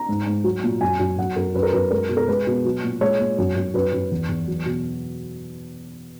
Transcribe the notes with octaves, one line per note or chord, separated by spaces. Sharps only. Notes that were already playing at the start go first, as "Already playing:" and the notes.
Already playing: A#5
G#2
G#2
F#3
A#2
F#2 G#5
F#2
F#2 F#5
F#2 A#4
F#2 B4
A#4
F#2 B4
G#3 A#4
B2
A#4
G#3 B4
B2
F#3
A#2
G#3 C#5
A#2
F#2
F#2
F#2 B4
F#2
E2
E2
F#3
B2